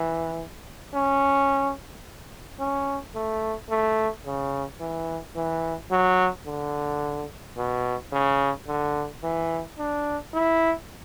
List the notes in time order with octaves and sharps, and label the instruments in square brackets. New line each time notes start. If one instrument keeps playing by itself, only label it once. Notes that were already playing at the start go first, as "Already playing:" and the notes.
Already playing: [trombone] E3
C#4
C#4
A3
A3
C#3
E3
E3
F#3
D3
B2
C#3
D3
E3
D4
E4